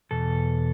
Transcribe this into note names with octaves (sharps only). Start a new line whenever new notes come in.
E2 B2 A4